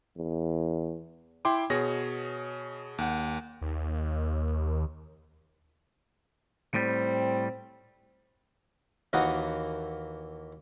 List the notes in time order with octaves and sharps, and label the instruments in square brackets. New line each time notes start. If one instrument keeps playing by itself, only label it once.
[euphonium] E2
[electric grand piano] E4 G5 C6 D6
B2 G#4 C#5 A#6
D#2 F#5
[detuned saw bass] D#2
[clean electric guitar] A2 G3 [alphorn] C4
[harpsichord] D#2 E3 A#3 F#4 F#5 D#6